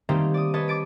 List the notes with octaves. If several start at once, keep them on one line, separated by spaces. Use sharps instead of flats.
D#3 G3 A3 A#3 C4 D#4
D5 D#6
B4 C#5 D#5 A5
D6 A6 D7 D#7